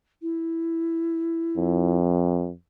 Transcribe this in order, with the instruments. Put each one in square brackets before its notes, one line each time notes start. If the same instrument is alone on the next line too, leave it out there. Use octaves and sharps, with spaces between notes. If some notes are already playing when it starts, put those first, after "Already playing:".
[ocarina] E4
[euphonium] F2